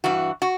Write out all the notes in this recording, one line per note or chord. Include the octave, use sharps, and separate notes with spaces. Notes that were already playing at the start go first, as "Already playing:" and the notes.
G2 E3 F#4
F#4